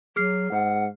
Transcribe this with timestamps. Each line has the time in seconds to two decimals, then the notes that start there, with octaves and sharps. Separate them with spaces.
0.16 F#3 G#4 F6 C7
0.51 G#2 F#5